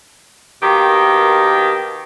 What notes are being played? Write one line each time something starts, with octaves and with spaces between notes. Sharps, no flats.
B2 D#3 A#3 G4